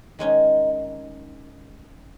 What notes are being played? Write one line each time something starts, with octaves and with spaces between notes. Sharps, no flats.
D#3 G#3 C#4 D#4